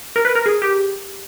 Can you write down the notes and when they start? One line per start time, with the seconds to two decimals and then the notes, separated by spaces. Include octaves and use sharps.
0.16 A#4
0.25 B4
0.35 A#4
0.46 G#4
0.62 G4